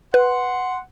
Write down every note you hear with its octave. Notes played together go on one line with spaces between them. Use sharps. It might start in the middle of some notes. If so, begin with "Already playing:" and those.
B4 F#5 C6